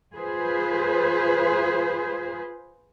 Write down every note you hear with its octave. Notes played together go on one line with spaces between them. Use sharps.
F4 G#4 B4 C5